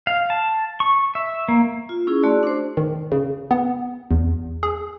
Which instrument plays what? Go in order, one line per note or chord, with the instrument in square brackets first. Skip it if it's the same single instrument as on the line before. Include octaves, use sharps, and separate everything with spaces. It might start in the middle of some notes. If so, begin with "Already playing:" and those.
[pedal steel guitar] F5
A5
C#6
E5
A#3
[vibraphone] F4
C#4 E4 G#4
A3 F#4 G#4 D5 C6
D4 C5
[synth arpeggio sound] D#3
C#3
B3
E2
G#4